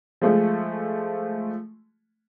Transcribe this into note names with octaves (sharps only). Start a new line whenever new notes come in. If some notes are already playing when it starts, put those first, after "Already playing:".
F3 G#3 A3